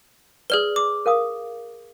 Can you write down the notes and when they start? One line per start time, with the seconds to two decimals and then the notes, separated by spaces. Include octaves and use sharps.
0.50 G#4 B4 D5 E6 F6 G7
0.76 D6
1.06 A#4 F5 D#6